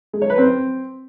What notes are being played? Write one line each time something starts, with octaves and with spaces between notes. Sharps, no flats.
G#3
C#5
B4
C4